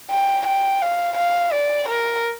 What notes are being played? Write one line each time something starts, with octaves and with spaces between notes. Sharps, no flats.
G5
G5
F5
F5
D5
A#4